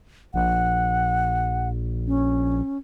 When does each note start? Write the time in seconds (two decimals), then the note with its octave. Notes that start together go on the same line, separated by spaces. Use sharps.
0.34 A#1 F#5
2.07 C#4